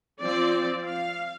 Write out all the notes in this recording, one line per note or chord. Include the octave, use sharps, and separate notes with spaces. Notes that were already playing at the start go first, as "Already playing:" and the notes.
F3 C4 D5
F5